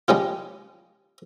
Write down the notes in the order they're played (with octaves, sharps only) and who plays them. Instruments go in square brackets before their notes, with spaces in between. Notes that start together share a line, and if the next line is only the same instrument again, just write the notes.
[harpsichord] G3 G#3 C#4 F4